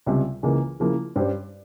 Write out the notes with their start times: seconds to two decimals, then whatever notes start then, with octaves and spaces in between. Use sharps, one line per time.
0.06 C#2 C3 G3
0.43 C#2 C#3 E3 A#3
0.80 C#3 F3 A#3 E4
1.16 G2 G3 C#4 G4 C5